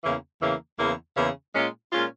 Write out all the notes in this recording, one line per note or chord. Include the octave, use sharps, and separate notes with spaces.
E2 C#3 E3 A#3
E2 C#3 E3 A#3
E2 C#3 E3 A#3
E2 C#3 E3 A#3
A#2 G#3 C#4 F4
A#2 G#3 C#4 F4